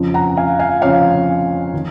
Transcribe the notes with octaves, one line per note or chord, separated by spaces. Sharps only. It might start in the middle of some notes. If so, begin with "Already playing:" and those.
Already playing: F2 C#3 F3
F#5 A#5
F5 G#5
F5 G#5
F2 C#3 F3 C#5 F5
D#3